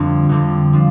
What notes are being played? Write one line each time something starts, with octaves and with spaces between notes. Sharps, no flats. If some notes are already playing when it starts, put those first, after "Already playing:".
Already playing: F2 D3 G3 C4 D4 F4
F2 D3 G3 C4
F3 D4